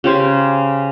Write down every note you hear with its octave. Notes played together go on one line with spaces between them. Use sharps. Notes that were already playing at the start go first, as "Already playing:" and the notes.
C#3 G4 C5 G#5